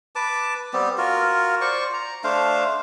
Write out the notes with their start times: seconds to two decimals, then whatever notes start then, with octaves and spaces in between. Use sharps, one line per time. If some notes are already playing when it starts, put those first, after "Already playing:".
0.15 B4 A5 D6
0.73 G3 B3 C4 G4
0.98 F4 F#4 A#4
1.61 C5 D5 C#6
1.94 A#5
2.24 A3 D4 C5 F5